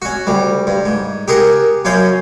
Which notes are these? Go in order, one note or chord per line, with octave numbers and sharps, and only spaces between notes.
C#4 F#4
D2 G3
G2
G#2
G4 G#4 A#4 F#5
F#2 C#4 C#5 F5 G5